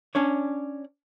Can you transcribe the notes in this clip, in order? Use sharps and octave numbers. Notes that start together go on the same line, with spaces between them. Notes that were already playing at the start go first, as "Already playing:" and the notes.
C#4 D4 C#5